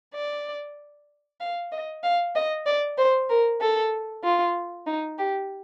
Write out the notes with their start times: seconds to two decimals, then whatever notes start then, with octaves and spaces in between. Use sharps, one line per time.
0.15 D5
1.40 F5
1.72 D#5
2.03 F5
2.35 D#5
2.66 D5
2.98 C5
3.30 A#4
3.61 A4
4.24 F4
4.87 D#4
5.18 G4